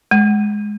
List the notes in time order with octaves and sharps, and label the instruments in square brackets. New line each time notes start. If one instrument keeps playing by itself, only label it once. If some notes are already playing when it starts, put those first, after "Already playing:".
[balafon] G#3